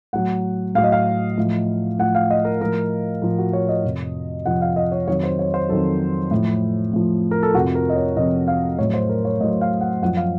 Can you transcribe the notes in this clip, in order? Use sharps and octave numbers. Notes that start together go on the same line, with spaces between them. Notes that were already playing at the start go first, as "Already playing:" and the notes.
A2 F#3 F#5
A2 F#3 F5
D#5
F5
A2 F3
A2 F3 F#5
F5
D#5
A#4
A2 F3 A#4
A2 F3 A#4
F#4
C#5
D#5
F2 C3 F3
F2 C3 F3 F#5
F5
D#5
C#5
F2 D#3 F#3 C#5
C5
C#5
C5
F2 D#3 F#3 A4
A2 F3
A2 F3
A#4
A4
F2 C3 F3 F#4
A#4
D#5
C#5
F2 C3 F3 D#5
F5
A2 F#3 C#5
C5
A#4
C#5
A2 F#3 D#5
F5
F#5
F#2 F3 F#5
F5